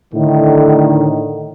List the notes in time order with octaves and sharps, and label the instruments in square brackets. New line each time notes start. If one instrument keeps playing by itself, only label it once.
[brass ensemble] A2 D3 D#3